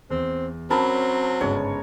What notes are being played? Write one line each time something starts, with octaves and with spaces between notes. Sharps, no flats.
E2 C4
F#3 C4 C#4 A#4 A5 B5
G1 G#2 C#3 C#5